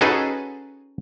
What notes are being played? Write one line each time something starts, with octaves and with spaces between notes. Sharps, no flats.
C#4 D#4 F#4 G#4 A4 B4